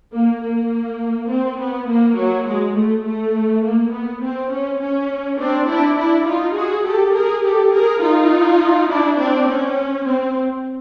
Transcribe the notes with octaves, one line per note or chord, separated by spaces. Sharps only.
A#3
A#3
C4
B3
A#3
F#3
G#3
A3
A3
A#3
B3
C4
C#4
C#4
C4 D4
D4 E4
D4 E4
D#4 F4
F#4 G#4
G4 A4
G#4 A#4
G4 A4
G#4 A#4
D#4 F4
D4 E4
C4 D4
C#4
C4